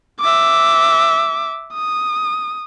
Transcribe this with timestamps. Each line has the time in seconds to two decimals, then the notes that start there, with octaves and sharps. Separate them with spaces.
0.20 E5 D6
1.73 D#6